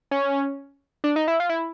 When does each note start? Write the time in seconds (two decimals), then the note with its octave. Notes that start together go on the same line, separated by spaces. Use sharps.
0.11 C#4
1.04 D4
1.16 D#4
1.28 E4
1.40 F4
1.49 E4